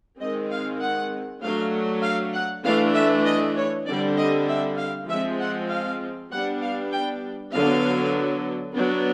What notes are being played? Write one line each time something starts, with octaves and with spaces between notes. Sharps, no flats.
D#3 G#3 C4 D#5
F5
F#5
F#3 A3 D4 F5
F5
F#5
E3 A3 D4 F5
E5
D#5
C#5
D3 G3 C4 D5
D#5
E5
F5
F3 G#3 C4 E5
F#5
F5
G3 B3 D4 F#5
F5
G5
D3 F#3 B3 F5
F#3 B3 D4